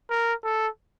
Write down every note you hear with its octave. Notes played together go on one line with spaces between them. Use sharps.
A#4
A4